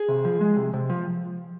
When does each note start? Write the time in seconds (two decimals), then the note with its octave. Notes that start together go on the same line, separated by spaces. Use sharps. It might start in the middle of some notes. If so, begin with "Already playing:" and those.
Already playing: G#4
0.09 C3
0.25 F3
0.41 G#3
0.56 C3
0.74 C3
0.90 F3